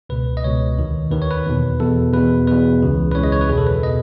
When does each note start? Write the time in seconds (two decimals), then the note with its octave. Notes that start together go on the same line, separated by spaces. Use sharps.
0.09 C#2 B2 B4
0.37 D#5
0.44 C#2 B2 C#5
0.78 D#2 D#3
1.11 D#2 D#3 B4
1.22 C#5
1.31 B4
1.46 E2 B2
1.80 E2 B2 A4
2.13 E2 B2 B4
2.47 E2 B2 B4
2.81 C#2 C#3 E3
3.12 B4
3.15 C#2 C#3 E3 C#5
3.24 D#5
3.32 C#5
3.41 B4
3.49 E2 G#4
3.52 B2
3.58 A4
3.67 B4
3.83 B2 D#5